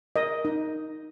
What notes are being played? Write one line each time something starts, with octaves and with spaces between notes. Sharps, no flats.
A#4 D#5
D#4